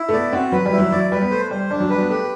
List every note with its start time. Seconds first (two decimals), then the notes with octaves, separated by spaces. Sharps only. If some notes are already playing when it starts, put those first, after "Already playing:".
Already playing: E4
0.09 A3
0.13 B3 D5
0.33 C4 F#4
0.52 F#3 B4
0.66 G3
0.72 E4
0.78 F#3
0.92 F#3 D5
1.11 G3 B4
1.21 B3
1.31 A3 C5
1.51 G3 C5
1.71 G3 D4
1.80 F#3
1.90 G3 B4
2.00 B3
2.10 A3 G4